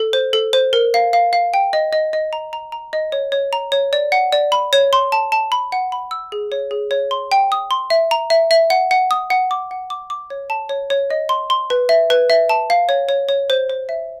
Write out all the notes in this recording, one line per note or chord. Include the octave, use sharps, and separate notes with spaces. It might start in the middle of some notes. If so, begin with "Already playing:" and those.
Already playing: A4
C5
A4
C5
A#4
F5
F5
F5
G5
D#5
D#5
D#5
A#5
A#5
A#5
D#5
C#5
C#5
A#5
C#5
D5
F#5
D5
B5
C#5
C6
A5
A5
B5
F#5
B5
E6
G#4
C#5
G#4
C#5
C6
G5
D#6
C6
E5
A#5
E5
E5
F#5
F#5
D#6
F#5
D6
F#5
D6
D6
C#5
A5
C#5
C#5
D#5
C6
C6
B4
E5
B4
E5
A5
F5
C#5
C#5
C#5
C5
C5
E5